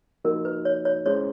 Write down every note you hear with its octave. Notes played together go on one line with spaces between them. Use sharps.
F3 A#3 D#4 F#4 A#4
B4
C#5
C#5
G#3 C#4 E4 G#4 C5 C#5